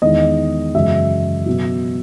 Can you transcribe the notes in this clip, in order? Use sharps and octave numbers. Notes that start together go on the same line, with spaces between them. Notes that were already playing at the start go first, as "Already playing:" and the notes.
E2 D#3 G#3 D#5
F#2 C#3 E3 G#3 E5
B2 F#3